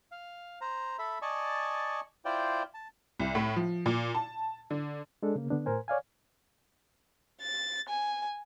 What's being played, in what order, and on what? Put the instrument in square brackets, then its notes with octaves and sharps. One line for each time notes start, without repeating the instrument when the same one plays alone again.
[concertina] F5
C5 A#5
A4 E5 B5
D5 D#5 G#5 A5 C#6
E4 F4 C5 D5 G5
A5
[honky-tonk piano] C2
A2
F3
A#2
A5
D3
[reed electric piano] G#3 D4 A4
C#3 A#3
D3 B3 D4
A2 A#4 C5 G#5
C#5 D5 F5 G#5
[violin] A6
G#5